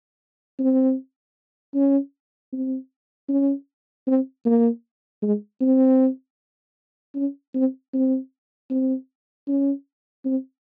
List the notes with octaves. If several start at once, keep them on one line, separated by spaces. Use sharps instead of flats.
C4
C#4
C4
C#4
C4
A#3
G#3
C4
C#4
C4
C4
C4
C#4
C4